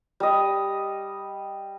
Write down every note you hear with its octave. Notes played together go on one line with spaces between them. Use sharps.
G3 D#5